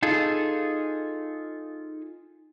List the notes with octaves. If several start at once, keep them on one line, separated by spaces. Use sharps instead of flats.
D#4 F4 G#4 A4